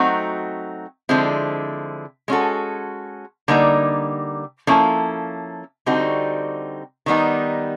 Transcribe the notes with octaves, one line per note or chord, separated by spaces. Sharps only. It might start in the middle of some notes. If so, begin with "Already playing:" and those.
Already playing: F#3 A3 C4 D#4 F#4
D3 F3 G#3 C4 E4
G#3 C#4 F#4 A4
D3 G3 A#3 D#4
F3 A#3 C#4 E4 A4
D3 G3 C4 D#4 F#4
D#3 G3 B3 D#4